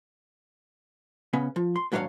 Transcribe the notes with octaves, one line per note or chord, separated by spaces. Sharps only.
C#3 B3 C#4
F3
C6
D#2 G#2 F#3 D4 C#5 F5